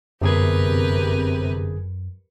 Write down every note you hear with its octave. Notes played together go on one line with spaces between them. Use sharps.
G1 F#2 C3 G4 G#4 A#4 B4 G#6